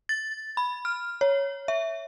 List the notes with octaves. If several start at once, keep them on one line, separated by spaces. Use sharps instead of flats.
A6
B5
F6
C#5
E5